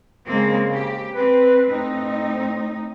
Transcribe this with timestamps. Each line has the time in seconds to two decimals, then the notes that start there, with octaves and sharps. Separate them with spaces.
0.25 C#3 G#3 A#3 C4
0.74 G4
1.15 C4 B4
1.69 A2 C4 D#4